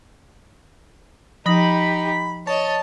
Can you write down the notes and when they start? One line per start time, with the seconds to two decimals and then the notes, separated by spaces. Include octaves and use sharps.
1.46 F3 D#4 G4 B5 D#6 A#6
2.47 C#5 D#5 A5